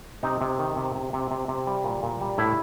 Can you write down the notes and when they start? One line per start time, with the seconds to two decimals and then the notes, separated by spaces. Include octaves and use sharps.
0.23 C3 D#4
0.41 C3
0.59 D#3
0.76 C3
0.95 C3
1.13 C3
1.31 C3
1.48 C3
1.67 G3
1.84 A#2
2.03 A#2
2.21 G3
2.38 A2 E4